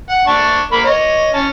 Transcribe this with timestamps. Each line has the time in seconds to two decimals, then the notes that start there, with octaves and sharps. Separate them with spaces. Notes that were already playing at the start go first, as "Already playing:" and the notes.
0.09 F#5
0.27 D4 A5 C#6
0.72 A#3 B5
0.84 C#5 D#5
1.34 C#4 A5